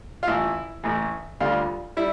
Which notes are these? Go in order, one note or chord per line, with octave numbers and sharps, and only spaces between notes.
F4
A1 A2 E3 E4
A1 A2 E3
D2 D3 G3 F4
G3 E4